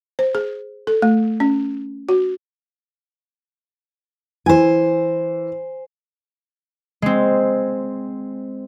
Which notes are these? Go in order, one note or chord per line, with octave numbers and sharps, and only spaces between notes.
C5
G#4
A4
A3
C#4
F#4
E3 C5 G#5
G#3 C4